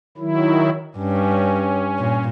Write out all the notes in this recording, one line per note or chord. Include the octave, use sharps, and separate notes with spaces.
D#3 F#3 E4
G2 C#4
A#2